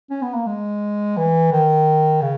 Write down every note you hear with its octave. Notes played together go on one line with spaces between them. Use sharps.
C#4
B3
A#3
G#3
E3
D#3
C#3